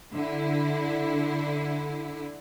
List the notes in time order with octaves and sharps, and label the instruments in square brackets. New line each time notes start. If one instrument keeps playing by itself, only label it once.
[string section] D3 E4